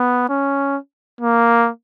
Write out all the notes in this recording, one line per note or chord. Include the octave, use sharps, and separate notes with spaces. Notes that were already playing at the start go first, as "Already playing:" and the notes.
Already playing: B3
C#4
A#3